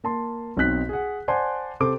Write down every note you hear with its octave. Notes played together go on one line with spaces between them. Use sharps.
A#3 A5 C6
B1 C4 D#4 F#6 B6
G#4 F#5
C5 D5 F#5 G#5 A5 C6
C3 A4 C5 D6